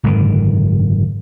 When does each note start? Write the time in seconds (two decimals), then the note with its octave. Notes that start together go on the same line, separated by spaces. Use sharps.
0.03 F#1 G#2 D3 D#3